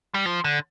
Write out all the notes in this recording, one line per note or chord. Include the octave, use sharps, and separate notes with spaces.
G3
F3
D3